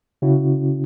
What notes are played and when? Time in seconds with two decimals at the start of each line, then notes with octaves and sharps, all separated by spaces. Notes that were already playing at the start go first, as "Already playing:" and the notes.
0.22 C#3 C#4 E4 F#4